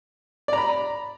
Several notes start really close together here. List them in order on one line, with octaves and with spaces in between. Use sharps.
D5 A#5 B5